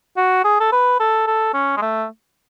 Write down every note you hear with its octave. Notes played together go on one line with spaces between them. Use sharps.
F#4
G#4
A4
B4
A4
A4
C#4
G#3
A3